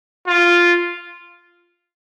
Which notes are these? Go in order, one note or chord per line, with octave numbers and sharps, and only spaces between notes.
F4